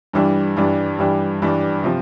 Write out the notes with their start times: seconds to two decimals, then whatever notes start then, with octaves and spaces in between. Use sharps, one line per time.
0.13 G2 E3 G3 D4
0.57 G2 E3 G3 D4
0.99 G2 E3 G3 D4
1.42 G2 E3 G3 D4
1.84 C3 F3